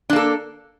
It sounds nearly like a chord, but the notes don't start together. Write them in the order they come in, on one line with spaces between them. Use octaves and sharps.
D4 A#3 A4